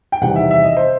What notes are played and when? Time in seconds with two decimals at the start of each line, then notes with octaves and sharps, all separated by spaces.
0.12 G5
0.21 E2 C3 D#3 G3 F#5
0.36 E5
0.51 E5
0.63 D#5
0.77 C5